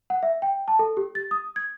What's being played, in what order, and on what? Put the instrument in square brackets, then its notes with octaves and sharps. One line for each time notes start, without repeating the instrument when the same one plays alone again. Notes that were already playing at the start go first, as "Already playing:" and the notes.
[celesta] F#5
E5
G5
A5
A4
G4
A6
D#6
G#6